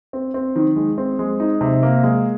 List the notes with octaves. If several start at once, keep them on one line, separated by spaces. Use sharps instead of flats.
C4
C4
D#3
G#3
C4
G#3
D#4
C3
A#3
G#3